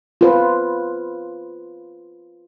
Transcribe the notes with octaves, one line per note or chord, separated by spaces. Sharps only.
F4 B4 C5